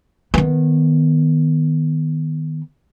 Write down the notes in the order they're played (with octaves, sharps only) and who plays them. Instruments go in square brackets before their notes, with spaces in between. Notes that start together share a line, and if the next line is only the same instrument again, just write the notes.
[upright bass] D#3 B3